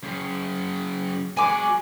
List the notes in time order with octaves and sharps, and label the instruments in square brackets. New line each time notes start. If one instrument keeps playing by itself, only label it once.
[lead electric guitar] F#2 C#3
[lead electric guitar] G#3 F#4 [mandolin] G#5 D6